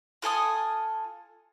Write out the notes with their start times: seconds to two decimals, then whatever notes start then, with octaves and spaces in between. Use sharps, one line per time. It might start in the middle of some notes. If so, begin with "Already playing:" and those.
0.22 F4 A4 G#5 D#6